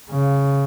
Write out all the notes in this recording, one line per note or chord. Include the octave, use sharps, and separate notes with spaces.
C#3